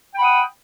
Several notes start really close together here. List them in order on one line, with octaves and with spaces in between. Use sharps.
G5 B5 F#5 D#6